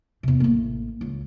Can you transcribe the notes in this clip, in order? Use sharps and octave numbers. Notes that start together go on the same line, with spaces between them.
E2 C3
A1 A#3
C#2